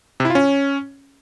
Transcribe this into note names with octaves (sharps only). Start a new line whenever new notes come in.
C3
E4
F4
C#4